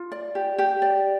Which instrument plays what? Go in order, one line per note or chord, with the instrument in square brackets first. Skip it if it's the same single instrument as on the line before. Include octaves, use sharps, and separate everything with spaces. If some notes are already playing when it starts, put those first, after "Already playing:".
Already playing: [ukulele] F4
D5
G4
G4
D5